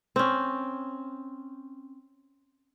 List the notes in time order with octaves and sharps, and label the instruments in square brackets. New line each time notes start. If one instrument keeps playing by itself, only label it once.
[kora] C4 C#4